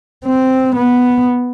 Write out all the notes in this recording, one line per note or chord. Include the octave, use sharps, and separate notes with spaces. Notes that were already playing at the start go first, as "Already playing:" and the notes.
C4
B3